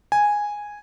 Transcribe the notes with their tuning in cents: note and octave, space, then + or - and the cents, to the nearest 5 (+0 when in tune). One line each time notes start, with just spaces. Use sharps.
G#5 -5